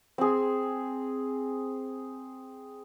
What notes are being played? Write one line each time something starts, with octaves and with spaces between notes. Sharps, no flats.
C4 G#4